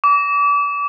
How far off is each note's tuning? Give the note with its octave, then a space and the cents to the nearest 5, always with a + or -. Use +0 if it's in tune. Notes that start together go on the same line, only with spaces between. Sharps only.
D6 -35